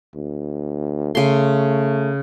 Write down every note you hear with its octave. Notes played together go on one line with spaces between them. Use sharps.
D2
C#3 A3 C6